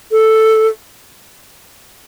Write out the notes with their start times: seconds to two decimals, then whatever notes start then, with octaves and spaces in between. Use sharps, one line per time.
0.12 A4